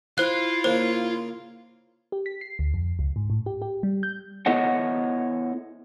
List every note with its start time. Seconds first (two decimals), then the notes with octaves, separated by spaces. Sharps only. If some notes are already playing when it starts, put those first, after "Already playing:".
0.18 E4 F4 C5 F#6
0.64 C#3 A#3 C5
2.12 G4
2.26 B6
2.41 C7
2.59 D2
2.74 F2
2.99 C#2
3.16 G#2
3.30 A2
3.46 G4
3.62 G4
3.83 G3
4.03 G6
4.46 B3 E4 A4 C#5 D#5 F#5